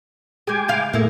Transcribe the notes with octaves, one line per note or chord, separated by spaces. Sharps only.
G#3 G#4 G5 G#5 D6
C#3 G#3 F5
A2 A3 A#3 E4 G#4